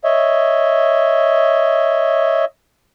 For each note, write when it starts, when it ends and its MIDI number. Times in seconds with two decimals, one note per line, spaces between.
0.04 2.45 73
0.04 2.45 75
0.04 2.45 76